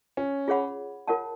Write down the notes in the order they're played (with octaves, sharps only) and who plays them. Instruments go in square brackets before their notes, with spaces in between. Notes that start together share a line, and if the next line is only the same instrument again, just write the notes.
[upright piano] C#4
[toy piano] F4 G#4 C#5 F#5 B5
F4 A#4 C#5 F#5 A5